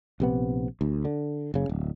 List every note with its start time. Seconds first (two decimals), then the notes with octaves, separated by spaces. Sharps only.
0.20 A#1 C3 B3
0.81 D2
1.05 D3
1.54 F#1 C#3
1.69 D1